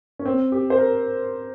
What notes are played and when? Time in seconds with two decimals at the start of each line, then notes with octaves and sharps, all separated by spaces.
0.19 C#4
0.26 C4
0.52 G4
0.70 C5
0.78 A#4